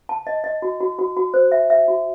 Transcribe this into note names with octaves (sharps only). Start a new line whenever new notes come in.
A5
D#5
D#5
F#4
F#4
F#4
F#4
C5
E5
E5
F#4